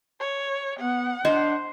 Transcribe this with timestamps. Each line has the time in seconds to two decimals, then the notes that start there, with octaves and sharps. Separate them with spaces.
0.20 C#5
0.80 B3 F#5
1.25 D4 C5 D#5